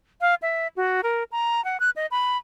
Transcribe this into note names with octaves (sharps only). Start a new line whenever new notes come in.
F5
E5
F#4
A#4
A#5
F#5
F#6
D#5
B5